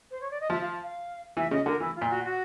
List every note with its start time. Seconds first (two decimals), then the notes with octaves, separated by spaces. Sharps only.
0.11 C5
0.21 C#5
0.31 D5
0.40 D#5
0.50 F3 E5
0.61 F5
0.83 F5
1.37 E3 E5
1.51 C#3 D#5
1.66 D3 A#4
1.80 E3 E4
1.95 F4
2.01 A#2
2.10 F#4
2.24 F#4